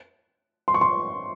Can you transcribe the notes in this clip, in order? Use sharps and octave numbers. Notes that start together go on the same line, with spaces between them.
C6
C#6
C6